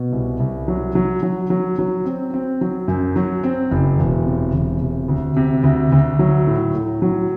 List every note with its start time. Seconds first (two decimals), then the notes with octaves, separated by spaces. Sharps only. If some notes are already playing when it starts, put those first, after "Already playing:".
Already playing: B2
0.12 C2
0.40 C2
0.68 F#3
0.95 F#3
1.23 F#3
1.50 F#3
1.79 F#3
2.05 C4
2.34 C4
2.61 F#3
2.88 F#2
3.16 F#3
3.44 C4
3.71 F#1
3.98 E1
4.26 C3
4.54 E1
4.81 C3
5.08 D2
5.36 C3
5.63 D2
5.92 D2
6.19 F#3
6.47 A2
6.75 A2
7.02 F#3